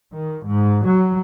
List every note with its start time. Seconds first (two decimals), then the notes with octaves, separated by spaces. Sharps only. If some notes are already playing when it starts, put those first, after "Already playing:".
0.11 D#3
0.43 G#2
0.85 F#3